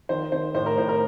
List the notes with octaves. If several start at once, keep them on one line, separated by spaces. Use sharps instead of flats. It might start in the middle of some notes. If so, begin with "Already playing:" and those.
D#3 C5
D#3 C5
A2 C5
A#4
A2 C5
A#4